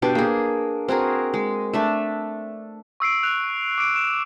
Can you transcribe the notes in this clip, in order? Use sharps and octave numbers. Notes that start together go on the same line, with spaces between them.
B2 D4 G4
A#3 G#4
C4 F#4 G#4 A#4
G#3
A3 D4 E5
C#6 E6 C7 D7
F#6 F7
D6 D7
C#6 D7 E7